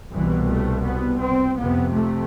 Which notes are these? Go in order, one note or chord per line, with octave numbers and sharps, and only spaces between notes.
C2 B2 E3
A3
B3
C4
F2 C3 B3
A3